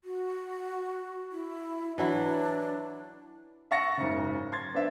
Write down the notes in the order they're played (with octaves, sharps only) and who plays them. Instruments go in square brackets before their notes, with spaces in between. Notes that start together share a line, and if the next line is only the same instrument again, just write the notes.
[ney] F#4
E4
[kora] E3 F#3 E4 [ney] D4
[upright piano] E5 F#5 C#6 A6 A#6 C#7
F#1 G#2 C#3
C6 G#6 A6
B3 D4 C5 E5